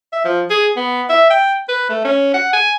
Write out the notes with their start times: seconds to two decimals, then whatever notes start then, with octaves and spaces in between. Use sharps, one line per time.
0.13 E5
0.25 F3
0.50 G#4
0.76 B3
1.09 E5
1.30 G5
1.69 B4
1.89 A3
2.05 C#4
2.34 F#5
2.53 G#5